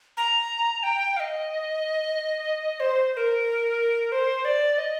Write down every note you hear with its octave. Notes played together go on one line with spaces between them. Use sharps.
A#5
G5
F5
D#5
C5
C5
A#4
C5
D5
D#5